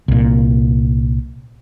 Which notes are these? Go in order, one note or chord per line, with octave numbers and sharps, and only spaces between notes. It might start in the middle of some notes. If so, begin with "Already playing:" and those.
C2 A#2